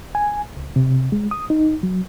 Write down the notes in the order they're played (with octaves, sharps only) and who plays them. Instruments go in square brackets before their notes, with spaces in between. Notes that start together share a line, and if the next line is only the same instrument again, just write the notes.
[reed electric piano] G#5
C#2
C3
G#3
D#6
D#4
F#3